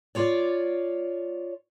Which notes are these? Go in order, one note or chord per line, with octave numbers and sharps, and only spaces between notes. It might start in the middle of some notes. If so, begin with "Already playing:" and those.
F4 C#5 D5